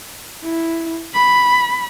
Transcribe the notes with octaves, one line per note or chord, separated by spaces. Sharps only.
E4
B5